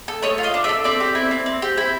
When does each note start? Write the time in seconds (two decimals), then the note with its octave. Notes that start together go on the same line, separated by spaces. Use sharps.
0.08 A4
0.22 A3 C#5 D#5
0.38 F4
0.43 D#5 F5
0.54 D4
0.64 D5 E5
0.69 A4
0.84 C4 D5 E5
1.00 G4
1.15 E4
1.31 C4
1.46 C4
1.62 G4
1.77 E4